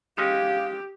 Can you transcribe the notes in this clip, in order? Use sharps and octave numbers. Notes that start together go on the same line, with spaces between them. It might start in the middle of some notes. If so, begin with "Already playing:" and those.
G#3 C#4 D#4 G4 F5